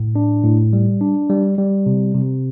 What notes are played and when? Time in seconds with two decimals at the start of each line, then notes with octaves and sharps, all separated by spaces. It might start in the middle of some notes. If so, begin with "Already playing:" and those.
Already playing: A2
0.16 D4
0.44 A2
0.73 G3
1.01 D4
1.30 G3
1.58 G3
1.86 C3
2.15 C3